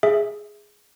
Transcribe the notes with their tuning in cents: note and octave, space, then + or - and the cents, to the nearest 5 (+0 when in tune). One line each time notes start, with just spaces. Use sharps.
G#4 +0 E5 +0